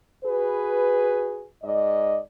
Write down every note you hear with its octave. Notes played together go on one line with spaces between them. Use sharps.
F#4 G#4 B4
G#2 D5 D#5